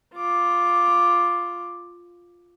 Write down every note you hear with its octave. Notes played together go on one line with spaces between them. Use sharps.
F4 D6